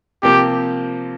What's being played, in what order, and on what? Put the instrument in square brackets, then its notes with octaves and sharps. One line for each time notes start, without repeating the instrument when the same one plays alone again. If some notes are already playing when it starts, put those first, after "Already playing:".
[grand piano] C3 F3 A#3 [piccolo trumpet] G4